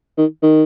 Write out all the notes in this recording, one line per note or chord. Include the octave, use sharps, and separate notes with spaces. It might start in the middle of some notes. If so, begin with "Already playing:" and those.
D#3
D#3